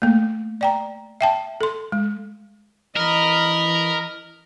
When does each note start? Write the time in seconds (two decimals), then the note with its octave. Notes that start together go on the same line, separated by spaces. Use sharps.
0.02 A3 A#3
0.61 D5 G5 A#5
1.21 E5 G5 A5
1.61 A4 C6
1.92 G#3
2.97 E3 A#4 D#5 B5